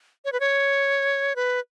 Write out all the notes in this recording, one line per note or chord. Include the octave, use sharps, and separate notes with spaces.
C#5
B4
C#5
B4